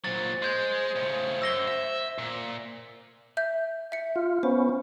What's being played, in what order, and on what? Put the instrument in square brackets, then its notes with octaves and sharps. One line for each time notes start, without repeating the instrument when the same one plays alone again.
[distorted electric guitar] A#2 F#3 [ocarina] C5 [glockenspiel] A6
[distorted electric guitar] G#3 [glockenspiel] C6 G6 G#6
[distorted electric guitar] A2 C#3
[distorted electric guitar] F#2 [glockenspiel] E6 A#6 G7
[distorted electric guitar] E5
A#2
[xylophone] E5 G6
E5 C#7
[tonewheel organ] F4
[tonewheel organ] B3 C#4 [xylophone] C5